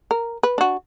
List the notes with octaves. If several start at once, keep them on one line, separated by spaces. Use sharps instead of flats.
A#4
B4
D4 F#4